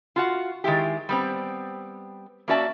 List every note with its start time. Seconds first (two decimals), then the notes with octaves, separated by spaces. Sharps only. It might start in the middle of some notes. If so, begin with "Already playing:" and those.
0.16 F4 F#4 F#5
0.64 D#3 G#3 E4 G4
1.09 G3 B3 C4
2.48 A#3 C#4 F#4 D5 E5 A5